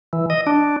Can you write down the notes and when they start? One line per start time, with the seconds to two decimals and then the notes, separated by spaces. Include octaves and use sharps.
0.13 E3
0.30 D#5
0.47 D4